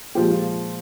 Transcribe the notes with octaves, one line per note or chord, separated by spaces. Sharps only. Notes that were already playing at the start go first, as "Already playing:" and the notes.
A#2 F3 G#3 G4
F4